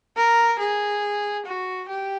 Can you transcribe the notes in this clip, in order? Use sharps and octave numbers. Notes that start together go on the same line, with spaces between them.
A#4
G#4
F#4
G4